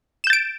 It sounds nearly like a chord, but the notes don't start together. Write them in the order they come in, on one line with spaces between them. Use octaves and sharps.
E7 G6 A6 D7